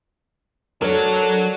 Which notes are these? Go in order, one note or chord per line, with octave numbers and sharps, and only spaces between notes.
F#3 D4 F#4 A4 A#4 C#5